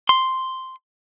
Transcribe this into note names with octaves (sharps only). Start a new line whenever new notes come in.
C6